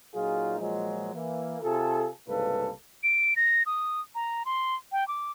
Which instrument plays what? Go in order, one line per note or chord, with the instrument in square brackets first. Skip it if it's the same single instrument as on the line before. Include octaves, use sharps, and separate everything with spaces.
[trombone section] A#2 F#3 D#4 F4 G#4
A#2 F3 F#3 G#3
E3 A#3
C3 F4 G#4 A4
C2 G#2 C#3 A#3 A4 B4
[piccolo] D7
A#6
D#6
A#5
C6
G5
D6